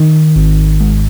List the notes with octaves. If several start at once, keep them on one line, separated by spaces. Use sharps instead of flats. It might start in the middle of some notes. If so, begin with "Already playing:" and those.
Already playing: D#3
G#1
G#2